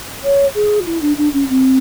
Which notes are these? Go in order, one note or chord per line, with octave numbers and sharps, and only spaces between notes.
C#5
G#4
F4
E4
D4
D4
C#4
C4